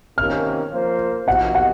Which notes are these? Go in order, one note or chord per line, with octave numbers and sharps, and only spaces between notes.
C3 D#3 A#3 C#4 F6
F3 A#3 F4 C5
C3 F3 A#3 D#4 F#4 F#5
F#5